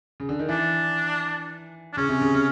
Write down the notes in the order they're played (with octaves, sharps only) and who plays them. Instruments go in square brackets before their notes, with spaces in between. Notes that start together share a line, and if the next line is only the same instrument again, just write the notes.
[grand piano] C#3
D3
D#3
[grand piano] E3 [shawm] D4
[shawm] D4
[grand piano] C#3 [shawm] C#4
[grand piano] C3
C#3
C#3